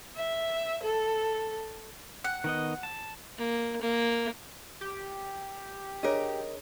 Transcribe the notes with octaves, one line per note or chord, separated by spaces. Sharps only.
E5
A4
F#5
D#3 B3 D#5
A5
A#3
A#3
G4
D4 G#4 A#4 C#5 D#5